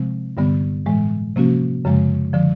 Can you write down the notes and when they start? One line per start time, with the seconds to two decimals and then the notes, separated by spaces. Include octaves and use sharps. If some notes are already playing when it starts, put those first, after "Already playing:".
Already playing: C3 F3 G#3 C4
0.37 G2 D3 G3 B3
0.86 A2 E3 G#3
1.36 C3 F3 A#3 C#4 F#4
1.85 F#2 C#3 F3 G#3
2.33 D3 F3